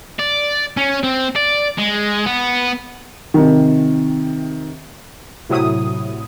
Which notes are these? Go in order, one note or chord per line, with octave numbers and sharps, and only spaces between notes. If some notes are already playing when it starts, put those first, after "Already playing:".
D5
C#4
C4
D5
G#3
B3
C3 D#3
A2 C3 F#3 E4 D#6